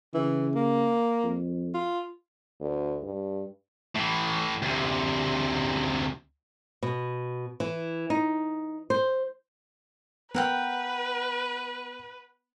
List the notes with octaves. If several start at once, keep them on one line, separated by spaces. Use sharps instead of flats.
C#3 E3
A#3
F2
F4
D2
G2
A2 E3
D2 C3
B2
E3
D#4
C5
B3 A#4 B4 F#5 G5